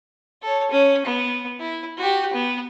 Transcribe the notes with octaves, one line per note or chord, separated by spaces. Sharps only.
A4 C#5
C#4
B3
E4
F#4 G4
B3